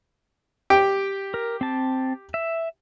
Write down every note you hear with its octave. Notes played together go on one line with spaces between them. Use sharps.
G4 G5
A#4
C4 A5
E5